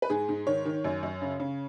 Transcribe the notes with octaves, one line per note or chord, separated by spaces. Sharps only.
B4
G#2 G#4
G#2
D#3 C#5
D#3
F#2
F#2
C#3
C#3